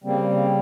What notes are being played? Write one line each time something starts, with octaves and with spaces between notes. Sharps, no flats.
C#3 G3 A#3 C4